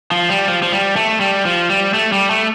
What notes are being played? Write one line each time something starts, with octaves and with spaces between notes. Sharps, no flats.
F3
G3
F3
F3
G3
A3
G3
F3
G3
A3
G3
A3